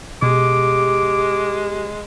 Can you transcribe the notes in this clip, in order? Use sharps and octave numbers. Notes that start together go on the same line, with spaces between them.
B2 G#3 G4 D6